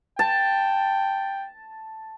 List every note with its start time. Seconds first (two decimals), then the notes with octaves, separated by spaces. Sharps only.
0.19 G5 A5